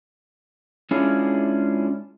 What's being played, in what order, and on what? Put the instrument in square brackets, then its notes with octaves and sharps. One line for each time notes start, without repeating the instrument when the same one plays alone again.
[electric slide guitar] G#3 C#4 D4 E4 F4 G#4